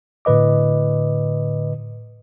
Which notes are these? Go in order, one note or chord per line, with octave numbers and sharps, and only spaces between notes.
A2 D3 B4 D#5 D6